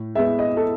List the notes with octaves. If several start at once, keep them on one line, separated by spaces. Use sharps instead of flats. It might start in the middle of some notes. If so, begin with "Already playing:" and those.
Already playing: A2
G#3 B3 E5
D#5
A4